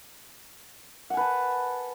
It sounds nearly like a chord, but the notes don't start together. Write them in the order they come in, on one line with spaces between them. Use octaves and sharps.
F#5 G#5 B4 A5